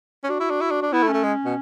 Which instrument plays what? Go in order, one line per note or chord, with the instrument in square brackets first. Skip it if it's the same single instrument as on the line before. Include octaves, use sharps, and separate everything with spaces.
[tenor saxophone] C#4
[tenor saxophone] D4 [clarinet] F#4
[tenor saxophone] E4
D4
E4
D4
D4
[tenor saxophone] B3 [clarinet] E4
[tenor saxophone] A3
[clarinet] C#4
[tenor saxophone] A3
G#3
B2